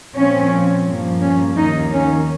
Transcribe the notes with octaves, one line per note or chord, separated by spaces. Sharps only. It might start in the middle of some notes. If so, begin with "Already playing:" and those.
A#2 F3 C4 C#4
G2 F3 A#3
C#4
D#2 D#3 A#3 D#4
C#4